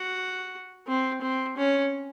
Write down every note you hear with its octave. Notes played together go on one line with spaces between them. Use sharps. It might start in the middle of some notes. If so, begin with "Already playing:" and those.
Already playing: F#4
C4
C4
C#4